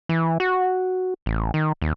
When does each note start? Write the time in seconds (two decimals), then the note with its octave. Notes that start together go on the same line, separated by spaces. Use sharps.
0.09 E3
0.40 F#4
1.26 A1
1.54 D#3
1.82 D#2